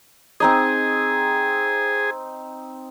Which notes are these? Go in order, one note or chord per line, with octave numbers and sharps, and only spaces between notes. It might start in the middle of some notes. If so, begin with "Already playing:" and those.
C4 D#4 G#4 D#5